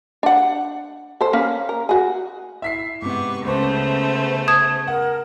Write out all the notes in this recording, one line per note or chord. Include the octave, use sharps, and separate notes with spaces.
D4 F#5
A4 C5
A#3 C#4 F5
A#4
F#4 G#4
E4 E5 B6 C7
G#2 C3 B3 C#6 D6
C#2 C#3 A3 B3 C5 C#6
A5 D#6 G#6 E7
A#4 F#5